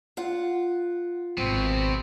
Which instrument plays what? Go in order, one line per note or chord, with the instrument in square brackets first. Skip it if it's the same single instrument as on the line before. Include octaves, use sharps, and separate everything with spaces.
[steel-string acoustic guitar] F4 F#5
[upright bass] G#1 [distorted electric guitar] B2 [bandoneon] C4